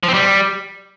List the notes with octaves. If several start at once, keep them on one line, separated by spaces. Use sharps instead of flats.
F3
C4
G3